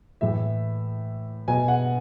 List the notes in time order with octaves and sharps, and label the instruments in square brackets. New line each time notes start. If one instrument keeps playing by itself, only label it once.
[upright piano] A2 E3 E5
B2 G#5
F#5